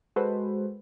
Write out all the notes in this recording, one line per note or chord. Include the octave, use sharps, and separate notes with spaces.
G#3 F#4 A4 B4 C5